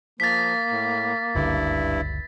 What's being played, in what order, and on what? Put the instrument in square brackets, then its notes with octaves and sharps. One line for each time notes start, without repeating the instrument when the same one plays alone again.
[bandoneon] F3 [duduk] A#3 [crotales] A6 B6
[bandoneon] A2
[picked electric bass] F#1 C#2 D3 [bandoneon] G2 E4